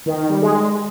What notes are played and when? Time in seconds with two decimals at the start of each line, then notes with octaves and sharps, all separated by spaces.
0.06 D#3
0.18 D#3
0.30 G3
0.42 G#3